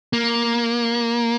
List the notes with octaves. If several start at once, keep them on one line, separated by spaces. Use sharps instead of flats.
A#3